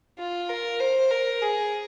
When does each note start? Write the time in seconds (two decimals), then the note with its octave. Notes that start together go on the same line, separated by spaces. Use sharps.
0.19 F4
0.50 A#4
0.80 C5
1.11 A#4
1.42 G#4